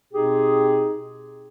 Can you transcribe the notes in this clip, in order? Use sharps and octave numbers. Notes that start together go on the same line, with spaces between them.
B2 C4 D#4 G4 G#4